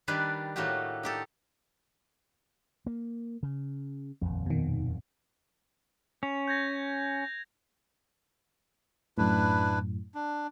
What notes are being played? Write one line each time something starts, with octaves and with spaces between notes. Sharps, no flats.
D#3 G3 D4 G4 B4 D5
A2 A3 A#3 F#4 G4
D#4 G4 A4
A#3
C#3
D#1 A#1 F2
B2 D#3
C#4 F7
G6 G#6 A#6
F#2 A2 D4 E4 B4
D4